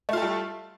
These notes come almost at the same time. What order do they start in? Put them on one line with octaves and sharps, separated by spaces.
A3 F4 A4 G3